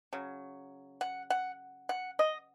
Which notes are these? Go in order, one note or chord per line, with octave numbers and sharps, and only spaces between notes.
C#3 F#3
F#5
F#5
F#5
D#5